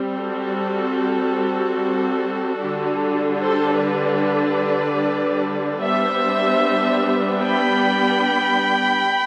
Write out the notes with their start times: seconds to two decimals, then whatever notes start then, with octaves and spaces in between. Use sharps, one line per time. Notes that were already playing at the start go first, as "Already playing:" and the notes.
Already playing: G3 C4
0.19 F#4 A4
2.59 D3 G3 D4
3.40 A4 C5
3.80 B4 D5
5.81 G3 B3 D4 C5 E5
7.41 G5 B5